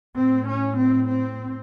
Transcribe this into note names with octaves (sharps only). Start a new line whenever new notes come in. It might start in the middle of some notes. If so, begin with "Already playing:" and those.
A2 C4
C#4
C4
C4